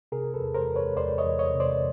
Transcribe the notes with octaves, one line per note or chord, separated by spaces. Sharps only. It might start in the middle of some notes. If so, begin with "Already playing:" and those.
C3 G#4 A#4
A4 B4
E2
A#4 C5
E2
B4 C#5
E2 C5 D5
C#5 D#5
E2
C#5 D#5
C3
C5 D5